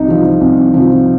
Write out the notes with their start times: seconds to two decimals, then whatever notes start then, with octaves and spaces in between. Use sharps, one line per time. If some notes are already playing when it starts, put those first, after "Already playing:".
Already playing: C2 D#4
0.08 C3 F3
0.41 C2
0.74 C3 F3